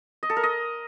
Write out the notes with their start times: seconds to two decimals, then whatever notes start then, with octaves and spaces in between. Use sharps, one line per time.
0.23 D#5
0.30 A4
0.37 A#4
0.43 D#5